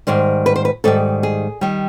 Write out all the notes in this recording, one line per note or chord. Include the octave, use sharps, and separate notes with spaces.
G#2 D#3 G3 C5
B4
C5
B4
G#2 D#3 G3 A4
G#4
D#3 G3